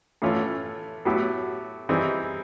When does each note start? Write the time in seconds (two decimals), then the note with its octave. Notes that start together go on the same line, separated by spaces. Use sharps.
0.22 A2 E3 A3 C#4 F4
1.05 A2 F#3 B3 E4 G4
1.89 E3 G3 C4 D#4 G#4